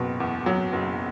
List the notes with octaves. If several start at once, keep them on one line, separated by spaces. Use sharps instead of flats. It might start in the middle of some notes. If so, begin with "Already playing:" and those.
Already playing: F#1 B2
E2
F#3
F#1